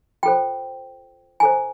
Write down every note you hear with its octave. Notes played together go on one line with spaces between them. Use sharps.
F4 A4 C5 G5
E4 A4 C5 G#5